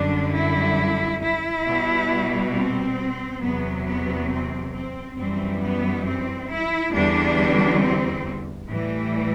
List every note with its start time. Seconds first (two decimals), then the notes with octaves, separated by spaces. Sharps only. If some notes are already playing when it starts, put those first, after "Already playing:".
Already playing: F#2 D3 G3 D4
0.34 E4
1.22 E4
1.66 B2 G3
2.54 C4
3.41 E2 C3 F#3 B3
3.86 B3
4.30 C4
4.73 C4
5.18 F#2 E3 G3 C4
5.62 B3
6.05 C4
6.50 E4
6.93 E2 D3 G3 D4
7.81 C4
8.69 A2 E3 G3